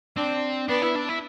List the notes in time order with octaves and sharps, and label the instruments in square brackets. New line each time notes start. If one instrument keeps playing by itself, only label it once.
[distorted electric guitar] C4 [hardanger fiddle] D4
[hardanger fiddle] B3 [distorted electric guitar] D4
[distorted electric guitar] E4
D4
E4